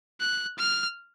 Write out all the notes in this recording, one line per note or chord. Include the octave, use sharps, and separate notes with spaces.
F#6
F6